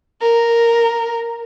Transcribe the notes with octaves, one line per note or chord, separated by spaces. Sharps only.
A#4